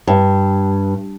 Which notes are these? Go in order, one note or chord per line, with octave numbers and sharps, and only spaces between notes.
G2